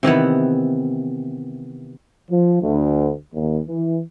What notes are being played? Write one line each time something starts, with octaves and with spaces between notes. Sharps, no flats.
C3 D#3 E3 B3
F3
D2
D#2
E3